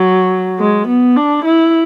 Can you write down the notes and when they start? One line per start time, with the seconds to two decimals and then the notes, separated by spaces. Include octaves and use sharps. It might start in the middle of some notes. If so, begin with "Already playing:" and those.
Already playing: F#3
0.59 G#3
0.88 B3
1.16 D4
1.45 E4